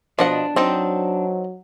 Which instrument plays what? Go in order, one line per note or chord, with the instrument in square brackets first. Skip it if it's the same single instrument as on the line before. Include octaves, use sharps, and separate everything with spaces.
[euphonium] B2 [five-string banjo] F3 D#5 F#5 [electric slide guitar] D4
[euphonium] F#3 [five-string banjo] C4 D#4 G5